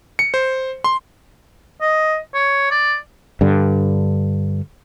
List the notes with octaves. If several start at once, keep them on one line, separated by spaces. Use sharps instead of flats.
C#7
C5
C6
D#5
C#5
D5
G2 D3